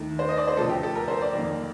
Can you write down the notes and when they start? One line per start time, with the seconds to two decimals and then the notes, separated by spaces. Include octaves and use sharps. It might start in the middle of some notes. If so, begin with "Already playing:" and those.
Already playing: D#2 D#3 A3
0.19 C5
0.29 D#5
0.37 D5
0.48 C5
0.57 D2 C3 F3 A3 A4
0.69 G4
0.83 A4
0.95 A#4
1.08 C5
1.22 D5
1.33 F2 D#3 A#3